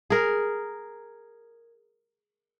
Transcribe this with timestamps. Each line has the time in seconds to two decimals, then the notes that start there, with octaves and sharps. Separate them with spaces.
0.10 G#4 A#4